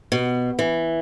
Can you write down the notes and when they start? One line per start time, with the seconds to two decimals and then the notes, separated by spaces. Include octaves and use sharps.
0.12 B2
0.59 E3